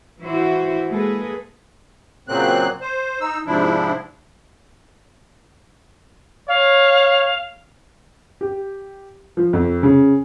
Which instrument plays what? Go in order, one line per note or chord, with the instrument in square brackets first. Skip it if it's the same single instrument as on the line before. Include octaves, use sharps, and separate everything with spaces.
[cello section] E3 E4 F#4 C5
G#3 A#3 G#4 A4 B4
[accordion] A#2 C#3 F#3 A#3 C4 F#6
C5
D#4 E6
G#2 C3 F3 D4 E4
[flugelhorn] C#5 [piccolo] F5
[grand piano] G4
F3
F2
C#3